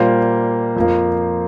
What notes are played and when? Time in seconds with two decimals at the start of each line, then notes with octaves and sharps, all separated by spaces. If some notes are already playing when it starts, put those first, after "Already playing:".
Already playing: A#2 G3 A#3 C5
0.76 F2 F3 A#3